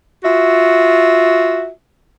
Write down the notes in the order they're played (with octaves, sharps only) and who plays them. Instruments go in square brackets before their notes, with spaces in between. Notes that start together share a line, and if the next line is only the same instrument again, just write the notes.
[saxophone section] F4 F#4 E5